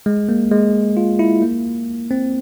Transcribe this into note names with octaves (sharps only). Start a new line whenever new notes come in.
G#3
A#3
G#3
F4
E4
A#3
C4